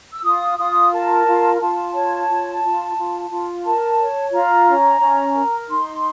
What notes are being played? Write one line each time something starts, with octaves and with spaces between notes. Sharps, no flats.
E6
F4 D#6
F4 D#6
A#4 A5
F4
A#5
F4 A5
C#5
F4
F4
F4
F4
A#4 A5
C#5
F4 A#5
C#4
C#4
A#4
D#4 C6